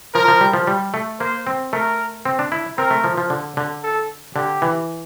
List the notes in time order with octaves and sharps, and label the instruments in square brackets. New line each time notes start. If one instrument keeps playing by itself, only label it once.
[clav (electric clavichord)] F3 [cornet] A#4
[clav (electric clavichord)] F3
G3
F3
G3
A3
[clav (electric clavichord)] A#3 [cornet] C5
[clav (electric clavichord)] C4
[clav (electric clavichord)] A3 [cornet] A#4
[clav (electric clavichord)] C4
D4
E4
[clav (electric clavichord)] C4 [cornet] A#4
[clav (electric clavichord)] A3
F3
F3
D3
D3
[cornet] A4
[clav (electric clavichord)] D3 [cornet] G4
[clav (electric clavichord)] E3